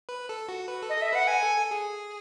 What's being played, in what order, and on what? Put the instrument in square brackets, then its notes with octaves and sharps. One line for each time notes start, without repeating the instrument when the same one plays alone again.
[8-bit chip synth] B4
A4
F#4
B4
A4
[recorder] D#5
[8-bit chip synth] A4 [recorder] E5
[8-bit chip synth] B4 [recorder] F#5
[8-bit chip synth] B4 [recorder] G#5
[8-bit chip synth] A4
A4
G#4